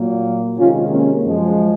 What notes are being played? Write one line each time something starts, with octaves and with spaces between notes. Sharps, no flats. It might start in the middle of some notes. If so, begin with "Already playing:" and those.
Already playing: A#2 F#3 A#3
C3 D#3 G#3 C#4 F4
A#3 C#4
F#2 F3 G#3